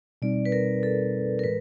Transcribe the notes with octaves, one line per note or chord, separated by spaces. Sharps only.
B2 G3 C4 D#4 D5
B4
A#4
A4
A#4
A2 E3 G#3 B4